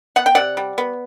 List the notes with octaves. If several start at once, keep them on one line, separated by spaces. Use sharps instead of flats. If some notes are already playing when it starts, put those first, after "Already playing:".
B3 F#5
G5
C3 D5 F#5
G3
B3